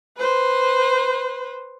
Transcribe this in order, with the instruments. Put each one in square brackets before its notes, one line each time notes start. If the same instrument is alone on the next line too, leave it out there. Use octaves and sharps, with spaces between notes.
[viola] B4 C5